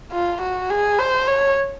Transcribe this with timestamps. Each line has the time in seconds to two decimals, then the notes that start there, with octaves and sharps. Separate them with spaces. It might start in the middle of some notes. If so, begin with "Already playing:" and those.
0.12 F4
0.42 F#4
0.70 G#4
0.99 C5
1.27 C#5